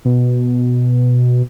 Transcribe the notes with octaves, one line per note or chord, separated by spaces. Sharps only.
B2